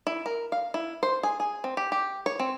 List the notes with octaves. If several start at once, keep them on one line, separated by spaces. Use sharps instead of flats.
E4
A#4
F5
E4
C5
G#4
G#4
C4
G4
G4
C#5
C4